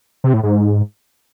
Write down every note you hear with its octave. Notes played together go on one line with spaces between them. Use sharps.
C3
A2
G#2